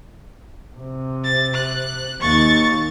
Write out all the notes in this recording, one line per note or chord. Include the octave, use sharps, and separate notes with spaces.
C3
A6
F#6
D#2 D#4 C#6 A6